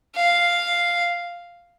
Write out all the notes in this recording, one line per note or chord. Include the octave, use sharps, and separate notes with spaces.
F5